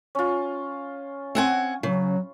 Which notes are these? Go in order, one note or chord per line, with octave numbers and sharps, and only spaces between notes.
C#4 F4
C4 F#5 G#5
C#3 F#3